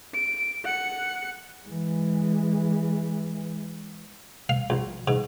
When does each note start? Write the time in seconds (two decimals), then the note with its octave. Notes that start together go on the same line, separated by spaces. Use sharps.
0.14 D7
0.64 F#5 C#7
1.67 E3 G#3
4.49 F5
4.70 A#1
5.08 G#2